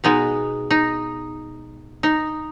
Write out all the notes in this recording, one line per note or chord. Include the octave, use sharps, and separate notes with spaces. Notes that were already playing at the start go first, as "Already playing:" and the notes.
B2 G#3 B3 D#4
D#4
D#4